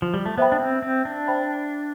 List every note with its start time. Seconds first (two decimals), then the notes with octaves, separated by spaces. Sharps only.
0.02 F3
0.14 G3
0.26 A3
0.38 B3 C5 E5 G5 B5
0.52 D4
0.60 C4
0.82 C4
1.05 D4
1.27 C5 E5 G5 B5